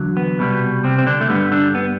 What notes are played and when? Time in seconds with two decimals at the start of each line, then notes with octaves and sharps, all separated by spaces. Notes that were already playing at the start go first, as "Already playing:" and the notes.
Already playing: E2 D3 F#3
0.17 B3
0.39 C2 B2 G3
0.84 C3 C4
0.99 C4
1.07 D3 D4
1.21 A3
1.29 G2 D3 G3 B3
1.52 D3 D4
1.75 B3